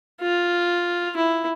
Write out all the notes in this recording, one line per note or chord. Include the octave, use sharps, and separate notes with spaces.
F4
E4